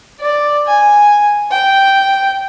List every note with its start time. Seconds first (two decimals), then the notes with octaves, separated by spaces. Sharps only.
0.20 D5
0.67 G#5
1.51 G5